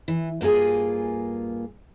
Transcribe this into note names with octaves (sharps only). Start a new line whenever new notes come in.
E3
G2 A#3 F4 G#4 G#5